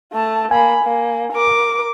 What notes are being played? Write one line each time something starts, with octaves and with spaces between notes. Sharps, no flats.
A3 A5
A#3 G#5 B5
A#3
A#4 D6